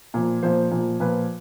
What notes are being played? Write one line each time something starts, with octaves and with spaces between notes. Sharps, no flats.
A#2 F3
A#2 F3 C5
A#2 F3
A#2 F3 B4